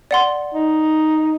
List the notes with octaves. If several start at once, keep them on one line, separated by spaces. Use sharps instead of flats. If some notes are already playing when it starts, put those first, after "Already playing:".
D5 F#5 C6
D#4